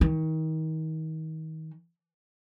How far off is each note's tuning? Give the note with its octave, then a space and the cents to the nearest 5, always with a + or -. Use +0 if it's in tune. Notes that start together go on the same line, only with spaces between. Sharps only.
D#3 +30